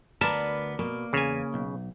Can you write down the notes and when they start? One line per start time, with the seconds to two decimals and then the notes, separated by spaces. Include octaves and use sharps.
0.21 D2 B3 A#4 B4 D5 A5
0.79 B2 A#3
1.13 E2 C#3 G#5
1.54 B1